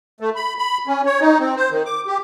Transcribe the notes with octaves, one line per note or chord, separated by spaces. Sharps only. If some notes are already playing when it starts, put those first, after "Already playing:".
A3
B5
B5
C#4
C#5
D#4
C4
C5
D#3
D6
G4